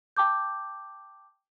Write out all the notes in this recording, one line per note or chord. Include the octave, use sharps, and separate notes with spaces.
G5 A5 D6 G6